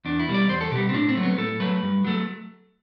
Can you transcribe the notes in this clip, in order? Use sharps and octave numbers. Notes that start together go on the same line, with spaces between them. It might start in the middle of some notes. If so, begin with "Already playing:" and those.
E2 D4
E4
B2 G3
D5
E2 C5
A4
B2 G3 G4
C4
A2 D4
C4
F#3 A3
B3
A2 A4
F#3 A3 B4
G2
F#3 A3